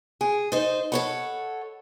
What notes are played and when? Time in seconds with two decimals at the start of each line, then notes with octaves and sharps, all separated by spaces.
0.21 G#4 G#5
0.52 D#4 C5 D#5
0.92 A4 C#5 F#5 B5